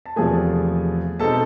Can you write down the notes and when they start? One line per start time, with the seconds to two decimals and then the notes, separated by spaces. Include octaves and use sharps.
0.06 A5
0.16 E2 C3 F3 A3 G#4 G#5
1.19 B2 G#3 C4 D#4 A4 A5